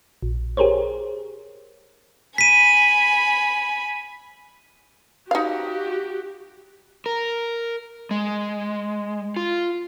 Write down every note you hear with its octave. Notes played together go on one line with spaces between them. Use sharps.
A#1
G4 G#4 A#4 C5 C#5
G#5 B5 B6 D#7
D#4 F#4 G4 F5
A#4
G#3
F4